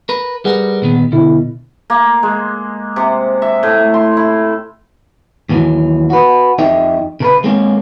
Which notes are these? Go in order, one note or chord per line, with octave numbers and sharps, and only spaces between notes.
A#4 B4
G3 G#4 A#4 B4 F#5
A#2 D#3 B3
B2 D3 E4
A#3
G#3
C3
E5
A2
C6
E4
D#2 B2 D#3 E3 F#3
F#4 B4
F2 D#4 G4 D#5 E5 G5
C#3 A#4 B4
G#3 A#3 C4 C#4